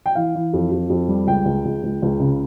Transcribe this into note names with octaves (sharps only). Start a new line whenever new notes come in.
G5
E3 F5
E3
F2
F2
F2
G3
C#2 G5
C#2
C#2
C#2
C#2
C#3